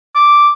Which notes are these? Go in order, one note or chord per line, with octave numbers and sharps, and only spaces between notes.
D6